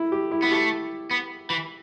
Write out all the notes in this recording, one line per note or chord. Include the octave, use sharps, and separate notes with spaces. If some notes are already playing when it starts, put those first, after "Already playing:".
Already playing: E4
G4
E4
B3 E4
A3 G4
B3
E3